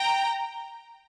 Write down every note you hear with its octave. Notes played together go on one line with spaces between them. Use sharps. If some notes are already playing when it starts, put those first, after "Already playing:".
Already playing: G5 A#5